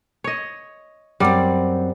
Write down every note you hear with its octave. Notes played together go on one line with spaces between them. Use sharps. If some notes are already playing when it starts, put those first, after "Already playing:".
C#5 D#5
F#2 G3 C4 D5